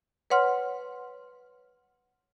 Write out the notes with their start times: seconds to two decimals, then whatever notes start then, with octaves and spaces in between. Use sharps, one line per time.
0.30 B4 C#5 F#5 C6 F6